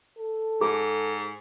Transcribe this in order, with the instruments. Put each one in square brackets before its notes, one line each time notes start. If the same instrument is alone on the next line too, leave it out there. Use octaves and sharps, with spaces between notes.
[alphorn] A4
[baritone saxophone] G#2 [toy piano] G#4